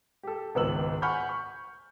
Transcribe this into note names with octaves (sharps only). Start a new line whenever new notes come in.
G4 A4
G#1 C#2 B3 E6 F#7
F#5 G#5 B5 C#6 F6 G6
C#6